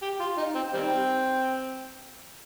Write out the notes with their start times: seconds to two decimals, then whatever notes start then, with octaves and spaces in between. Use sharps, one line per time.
0.02 G4
0.20 F4
0.38 D#4
0.55 C4
0.73 D#3 G3 C4